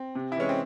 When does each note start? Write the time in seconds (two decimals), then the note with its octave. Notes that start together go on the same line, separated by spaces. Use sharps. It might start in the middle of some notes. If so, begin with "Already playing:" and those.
Already playing: C4
0.15 C3
0.32 E4
0.36 E3 G#3 C#4
0.49 C4